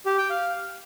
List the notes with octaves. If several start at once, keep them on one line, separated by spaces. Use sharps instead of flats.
G4
G5
F5